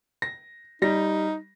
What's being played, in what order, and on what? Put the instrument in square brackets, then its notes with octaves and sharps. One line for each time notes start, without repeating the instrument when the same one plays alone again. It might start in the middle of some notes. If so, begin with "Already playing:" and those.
[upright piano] A#6
[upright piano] G3 A#6 [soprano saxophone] D#4